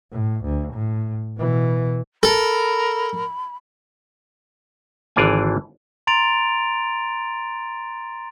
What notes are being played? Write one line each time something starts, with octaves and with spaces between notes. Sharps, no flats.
A2
D2
A2
B2 E3
A4 A#4 B5
G#1 D3 E3 D5 F5 G#5
A#5 C6 A6 D7 F7